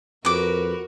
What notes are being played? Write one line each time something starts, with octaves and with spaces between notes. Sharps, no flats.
F2 F#4 A#4 B4 D6